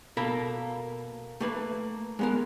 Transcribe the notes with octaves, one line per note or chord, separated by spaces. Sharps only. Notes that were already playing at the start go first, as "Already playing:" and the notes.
B2 A#3 A4 A#4 B5
A3 A#3 B4
G#3 B3 A#4